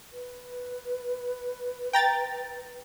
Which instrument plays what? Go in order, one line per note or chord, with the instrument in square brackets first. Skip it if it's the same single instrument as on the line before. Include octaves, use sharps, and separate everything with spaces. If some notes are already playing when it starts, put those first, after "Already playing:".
[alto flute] B4
[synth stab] G5 A#5 A6